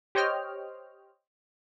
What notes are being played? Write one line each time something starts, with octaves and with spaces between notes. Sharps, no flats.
G4 C5 C#5 D#5 G5 F6